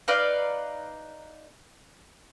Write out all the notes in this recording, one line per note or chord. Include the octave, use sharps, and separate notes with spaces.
D#4 B4 D5 F5